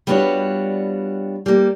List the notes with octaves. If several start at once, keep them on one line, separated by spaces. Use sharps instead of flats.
G3 B3 D4 F4 F#4 C#5
G3 A#3